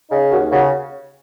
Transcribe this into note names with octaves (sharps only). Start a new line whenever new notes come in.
C#3 D#4
D#2 F#4
C#3 F#4